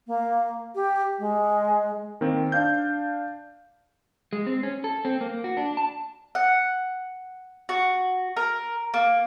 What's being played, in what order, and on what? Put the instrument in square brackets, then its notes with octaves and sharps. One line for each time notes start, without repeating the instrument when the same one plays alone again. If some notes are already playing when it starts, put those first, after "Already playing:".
[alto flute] A#3
G4
G#3
[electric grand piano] D#3 A#3 C4
D4 F5 G6
[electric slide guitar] G#3
C4
C#4
A4
C4
A#3
F#4
D4
A5
[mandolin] F#5
F#4
A#4
A#3